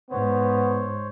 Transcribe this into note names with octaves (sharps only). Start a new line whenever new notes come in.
G#2 B3 C5 C#5